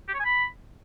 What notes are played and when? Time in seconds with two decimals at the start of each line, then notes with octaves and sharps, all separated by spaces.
0.08 G4
0.14 C#5
0.19 G#5
0.25 B5